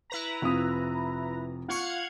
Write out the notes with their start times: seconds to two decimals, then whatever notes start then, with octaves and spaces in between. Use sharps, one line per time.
0.10 E4 B4 A#5
0.42 F1 F4 D#6
1.68 F4 F5 F#5 C#6 G#6 C#7